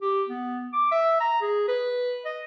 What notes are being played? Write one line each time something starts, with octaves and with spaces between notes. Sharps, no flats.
G4
B3
D6
E5
A#5
G#4
B4
D#5